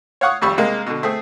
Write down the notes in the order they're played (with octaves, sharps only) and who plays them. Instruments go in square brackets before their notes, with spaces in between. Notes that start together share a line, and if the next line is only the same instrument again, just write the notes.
[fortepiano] C#5 F5 F#5 C#6 D#6
G#1 F2 G3 B5 C#6 E6
C3 G#3 A#3
B2 D3
A3 C4 G#4